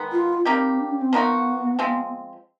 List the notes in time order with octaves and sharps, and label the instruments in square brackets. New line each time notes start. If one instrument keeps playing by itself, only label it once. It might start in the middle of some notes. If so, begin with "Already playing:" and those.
Already playing: [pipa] D#3 G#3 B3
[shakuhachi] F4
[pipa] G3 A#3 D#4 G4 [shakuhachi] C4
[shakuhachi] D4
C#4
C4
[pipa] F3 A#3 D#4 F#4 [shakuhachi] B3
[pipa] F3 G#3 C4